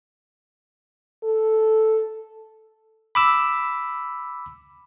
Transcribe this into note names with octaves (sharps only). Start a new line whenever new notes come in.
A4
B5 D6 E6